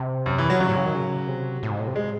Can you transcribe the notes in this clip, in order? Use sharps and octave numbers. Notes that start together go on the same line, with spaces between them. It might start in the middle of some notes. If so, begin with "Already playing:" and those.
Already playing: C3
F#2
E3
F#3
C#3 F#3
A2
C#3
D#3
C#3
C3
A2
G#2
A2
C3
G#3